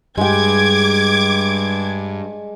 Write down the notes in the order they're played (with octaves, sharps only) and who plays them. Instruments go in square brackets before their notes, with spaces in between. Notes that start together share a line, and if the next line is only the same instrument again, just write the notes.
[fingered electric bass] G2 [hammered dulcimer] G#3 G5 [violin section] D6 G#6